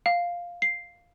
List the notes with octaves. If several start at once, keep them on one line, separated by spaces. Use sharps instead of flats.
F5
C7